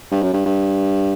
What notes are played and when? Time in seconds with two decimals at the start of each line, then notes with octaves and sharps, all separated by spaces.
0.11 G2
0.23 F#2
0.34 G2
0.46 G2